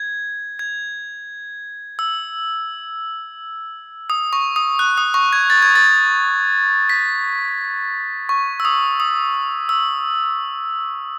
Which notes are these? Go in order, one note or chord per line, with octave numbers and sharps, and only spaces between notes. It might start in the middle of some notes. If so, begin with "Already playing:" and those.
Already playing: G#6
G#6
E6
D#6
C#6
D#6
F#6
D#6
C#6
G#6
A6
G#6
A6
B6
C#6
E6
D#6
D#6
E6